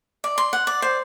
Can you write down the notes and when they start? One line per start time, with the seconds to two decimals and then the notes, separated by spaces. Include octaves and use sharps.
0.24 D5
0.38 C6
0.53 F#5
0.67 D5
0.82 C5